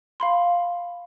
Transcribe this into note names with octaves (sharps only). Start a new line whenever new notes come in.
F5 B5 C6